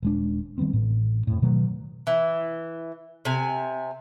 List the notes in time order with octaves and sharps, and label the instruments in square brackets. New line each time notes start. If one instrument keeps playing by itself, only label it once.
[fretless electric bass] D#1 G#3 D4
D#3 G3 B3 C4
A1 A2
F2 A2
B2 D#3 F#3 A3
[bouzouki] E3
C3 G#5